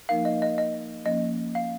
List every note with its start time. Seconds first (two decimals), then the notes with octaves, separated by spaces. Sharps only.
0.09 F3 A#3 D#4 A#4 F5
0.25 D#5
0.42 D#5
0.58 D#5
1.06 F3 A#3 C#4 D#5
1.55 F5